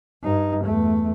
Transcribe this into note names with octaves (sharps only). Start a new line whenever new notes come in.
G2 D#4
E2 A3